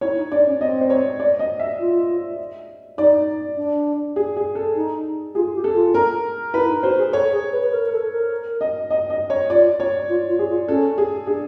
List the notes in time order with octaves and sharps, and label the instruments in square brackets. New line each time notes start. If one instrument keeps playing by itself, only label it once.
[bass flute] E4 [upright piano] C#5
[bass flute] D#4
[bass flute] D4 [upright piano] D5
[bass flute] C#4
[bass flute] C4 [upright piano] D#5
[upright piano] C5
C#5
D5
D#5
E5
[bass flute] F4
[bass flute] D#4 [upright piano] D5
[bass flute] D4
[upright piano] G#4
G#4
A4
[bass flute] D#4
[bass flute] F4 [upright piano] G#4
[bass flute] G4
[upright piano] A4
[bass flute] F4
[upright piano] A#4
[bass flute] E4 [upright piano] B4
[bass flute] D#4
[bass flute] F#4 [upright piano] C5
[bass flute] G#4
[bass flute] A4 [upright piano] C#5
[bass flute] G#4
B4
B4
A#4
A#4
A4
A#4
[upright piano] D#5
D#5
D#5
C#5
[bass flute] F4 [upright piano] D5
[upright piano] C#5
[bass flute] F4
F4
[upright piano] G#4
[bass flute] F4
[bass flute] C#4 [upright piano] A4
[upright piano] G#4
[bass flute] D4 [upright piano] G#4